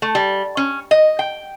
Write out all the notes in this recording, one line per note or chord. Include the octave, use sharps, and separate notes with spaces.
A3
G3
C#4
D#5
G5